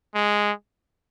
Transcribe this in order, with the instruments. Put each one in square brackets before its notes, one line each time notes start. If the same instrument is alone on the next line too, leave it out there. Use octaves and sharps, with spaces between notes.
[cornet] G#3